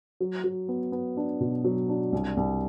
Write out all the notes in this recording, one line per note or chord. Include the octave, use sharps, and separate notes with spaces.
F#3
F#3
B3
B3
D4
B2
F#3
D4
C2
C2